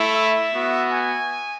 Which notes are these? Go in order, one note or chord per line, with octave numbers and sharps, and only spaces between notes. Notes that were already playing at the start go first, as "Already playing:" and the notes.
Already playing: A3 E4
E5
B3 F#4
G#5